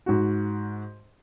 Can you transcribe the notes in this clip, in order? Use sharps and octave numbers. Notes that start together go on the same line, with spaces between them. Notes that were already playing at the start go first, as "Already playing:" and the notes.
G#2 F#4